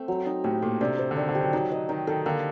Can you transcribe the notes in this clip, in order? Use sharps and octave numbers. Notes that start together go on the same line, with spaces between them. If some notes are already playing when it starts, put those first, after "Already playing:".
Already playing: A3 C4
F#3
D#4
A2 G4
A#2 A3
C3 D4
C5
D3
D#3 D4
D3
G4
F#3
F#3 D#4
D#5
D#3 D#4
D#3 A4
D3 A#3